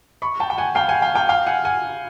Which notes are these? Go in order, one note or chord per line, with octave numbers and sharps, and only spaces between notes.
B5 C#6
G5 A5
G5
F#5 G#5
F5 G5
F#5 G#5
F5 G5
F5 G5
F5 G5
F#5 G#5
F#5 G#5